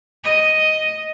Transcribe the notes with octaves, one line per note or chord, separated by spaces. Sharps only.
D#5